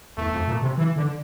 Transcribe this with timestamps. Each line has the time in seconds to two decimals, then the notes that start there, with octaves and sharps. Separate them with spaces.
0.17 E2 A3
0.33 F2
0.48 A#2
0.62 C3
0.78 E3
0.96 D3